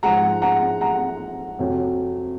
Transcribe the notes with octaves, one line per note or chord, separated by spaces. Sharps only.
G#2 F3 G#3 F#5 A#5
F#5 A#5
F#5 A#5
F2 C3 F#3